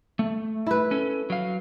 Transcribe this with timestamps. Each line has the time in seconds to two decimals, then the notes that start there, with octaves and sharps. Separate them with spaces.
0.19 A3
0.67 E4 B4
0.91 C#4 A4
1.30 F#3 F5